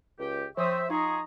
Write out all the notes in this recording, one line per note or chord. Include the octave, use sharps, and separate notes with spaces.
C#2 G4
F3 C4 C5 C#5 E5 C#6 D#6
D#4 F4 G#4 D#5 A#5 C#6